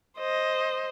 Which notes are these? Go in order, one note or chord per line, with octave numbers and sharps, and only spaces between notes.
C5 D#5